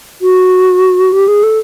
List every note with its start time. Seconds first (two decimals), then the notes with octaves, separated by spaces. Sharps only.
0.22 F#4
1.12 G4
1.28 G#4
1.43 A4